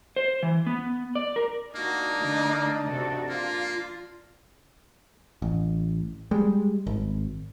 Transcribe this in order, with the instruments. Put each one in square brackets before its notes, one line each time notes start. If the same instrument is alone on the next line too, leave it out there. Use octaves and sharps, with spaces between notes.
[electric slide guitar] C5
E3
B3
D5
A#4
[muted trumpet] A#3 [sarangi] D4 [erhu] D#4 [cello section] F#4
[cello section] D3 A3
C3 F#4 A4
[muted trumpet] A#3 [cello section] F4
[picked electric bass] A1
G3 G#3
G#1